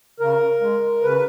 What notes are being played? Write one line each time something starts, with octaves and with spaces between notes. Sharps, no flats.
C#3 A#4
G#3
C#3 B4